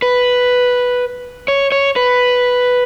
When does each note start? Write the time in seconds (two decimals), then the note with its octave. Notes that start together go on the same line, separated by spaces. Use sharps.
0.02 B4
1.48 C#5
1.72 C#5
1.96 B4